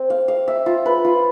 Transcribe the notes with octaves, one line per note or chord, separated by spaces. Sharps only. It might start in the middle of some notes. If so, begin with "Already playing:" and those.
Already playing: C4
F5
F5
E5
F4
B4
F4